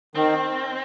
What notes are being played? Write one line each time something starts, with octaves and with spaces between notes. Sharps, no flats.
D#3 C4